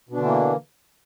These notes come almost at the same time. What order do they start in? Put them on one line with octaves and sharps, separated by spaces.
B2 D4 D3 E3 A#3